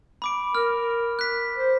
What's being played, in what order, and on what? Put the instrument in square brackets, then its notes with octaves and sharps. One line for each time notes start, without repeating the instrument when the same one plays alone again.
[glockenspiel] B5 D6 D7
[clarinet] A#4 [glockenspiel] F6
[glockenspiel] F#6 B6
[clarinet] C5